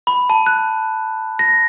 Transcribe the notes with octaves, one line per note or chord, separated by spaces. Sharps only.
B5
A5
F#6
A#6